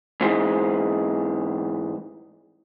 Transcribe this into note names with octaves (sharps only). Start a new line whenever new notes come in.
G#2 E3 G#3